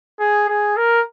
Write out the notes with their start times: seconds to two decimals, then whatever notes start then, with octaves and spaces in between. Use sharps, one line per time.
0.20 G#4
0.49 G#4
0.77 A#4